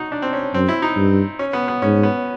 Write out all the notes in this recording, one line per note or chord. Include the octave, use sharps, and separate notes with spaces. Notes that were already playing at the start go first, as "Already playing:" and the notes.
Already playing: D#4 F#4
D4
C4
C#4
F#2 C4
E4
D#4
G2
C#4
B3
B3
G#2 C#4
B3